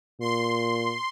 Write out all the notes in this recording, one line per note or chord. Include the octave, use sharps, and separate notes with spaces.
A#2 C6